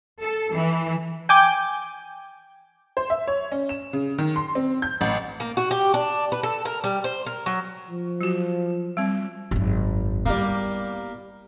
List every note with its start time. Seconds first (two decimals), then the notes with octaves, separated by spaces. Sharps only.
0.21 A4
0.52 E3
1.29 G5 G#5 D6 G6
2.97 C5
3.10 E5
3.27 C#5
3.52 C#4
3.69 E7
3.93 C#3
4.18 D#3
4.36 C6
4.55 C4
4.82 G6
5.01 A1
5.40 A#3
5.57 F#4
5.71 G4
5.94 D4
6.32 B4
6.43 A4
6.65 A#4
6.84 G3
7.04 C5
7.26 A#4
7.46 F#3
7.90 F3
8.21 F#3 F#4
8.97 G3 C4
9.51 G#1 F#2
10.26 G3 A#3 B3 E4